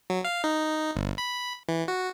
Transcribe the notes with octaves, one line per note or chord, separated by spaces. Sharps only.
F#3
F5
D#4
G1
B5
E3
F#4